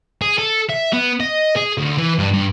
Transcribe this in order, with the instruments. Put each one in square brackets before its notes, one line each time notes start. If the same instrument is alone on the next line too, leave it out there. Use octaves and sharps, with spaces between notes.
[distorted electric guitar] G#4
A4
E5
B3
D#5
G#4
D2
E3
G2
G2